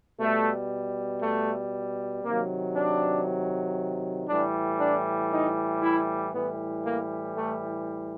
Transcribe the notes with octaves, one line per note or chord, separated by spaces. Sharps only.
B2 G3 A3
A3
C3 D#3 F#3 A#3
D4
A2 E3 G3 D4
D4
D#4
E4
A2 E3 G3 B3
A#3
A3